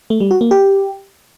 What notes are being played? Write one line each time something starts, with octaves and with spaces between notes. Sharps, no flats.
A3
G3
F#4
A#3
G4